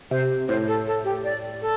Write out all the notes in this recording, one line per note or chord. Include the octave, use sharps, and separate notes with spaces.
C3 C5
A2 C5
A4
A4
G4
D5
A4